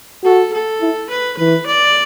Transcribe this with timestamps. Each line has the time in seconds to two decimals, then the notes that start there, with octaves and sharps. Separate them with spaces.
0.24 F#4 A4
0.53 A4
0.81 E4
1.10 B4
1.37 E3 B4
1.67 D5